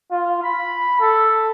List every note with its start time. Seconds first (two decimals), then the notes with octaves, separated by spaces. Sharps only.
0.12 F4
0.43 B5
1.01 A4